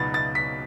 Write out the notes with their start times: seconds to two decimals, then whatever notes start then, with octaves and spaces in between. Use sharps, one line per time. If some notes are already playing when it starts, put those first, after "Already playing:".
Already playing: C#2 B2 F#3 B3 D#4 B5 A6
0.14 A6
0.35 B6